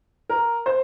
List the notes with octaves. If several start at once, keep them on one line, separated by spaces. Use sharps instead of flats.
A#4
C5